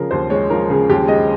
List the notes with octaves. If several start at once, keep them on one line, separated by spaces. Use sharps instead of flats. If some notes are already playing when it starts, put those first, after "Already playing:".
Already playing: C#3 F3 G#4 A#4
D#2 C5
G#3 C#5
F3 A#4
C#3 G#4
D#2 G4
G#3 D#5